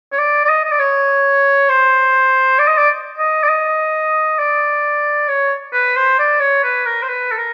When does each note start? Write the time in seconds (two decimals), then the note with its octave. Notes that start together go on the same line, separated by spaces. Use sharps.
0.12 C#5
0.18 D5
0.44 D5
0.49 D#5
0.64 D#5
0.72 D5
0.80 C#5
1.69 C5
2.59 D5
2.68 D#5
2.78 D5
3.18 D#5
3.43 D5
3.49 D#5
4.39 D5
5.29 C#5
5.73 B4
5.96 C5
6.19 D5
6.40 C#5
6.64 B4
6.86 A#4
7.03 C5
7.08 B4
7.31 A4
7.38 A#4